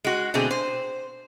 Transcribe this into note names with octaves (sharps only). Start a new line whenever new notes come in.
G#3 F#4
B2 D3 A3 C4 G#4
C5